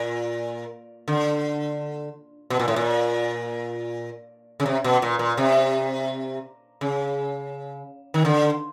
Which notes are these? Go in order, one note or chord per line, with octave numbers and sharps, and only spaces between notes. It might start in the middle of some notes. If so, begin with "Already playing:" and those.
Already playing: A#2
D3
B2
A#2
A2
A#2
C#3
C3
B2
A#2
A#2
C3
C#3
D#3
D3